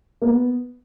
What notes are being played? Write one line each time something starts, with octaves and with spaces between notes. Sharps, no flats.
A#3
B3